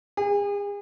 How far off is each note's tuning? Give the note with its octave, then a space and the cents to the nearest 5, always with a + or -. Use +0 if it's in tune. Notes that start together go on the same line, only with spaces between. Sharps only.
G#4 -40